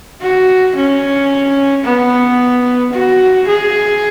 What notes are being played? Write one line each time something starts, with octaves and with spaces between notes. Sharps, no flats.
F#4
C#4
B3
F#4
G#4